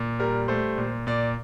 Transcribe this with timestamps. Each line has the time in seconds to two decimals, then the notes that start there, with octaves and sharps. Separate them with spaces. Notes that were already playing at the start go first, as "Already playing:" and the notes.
Already playing: A#2
0.19 G3 A#4
0.48 A3 C5
0.78 A#2
1.07 A#2 D5